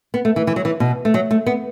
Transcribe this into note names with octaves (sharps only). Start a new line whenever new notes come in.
B3
A3
E3
E3
F#3
E3
B2
A3
F#3
A3
B3